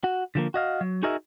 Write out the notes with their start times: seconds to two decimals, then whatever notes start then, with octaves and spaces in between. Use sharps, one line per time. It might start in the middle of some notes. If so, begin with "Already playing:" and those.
0.04 F#4
0.35 D3 F3 A#3
0.54 F#4 D#5 F5
0.81 F#3
1.03 D#4 F#4 G#4 A#4 D#5 E5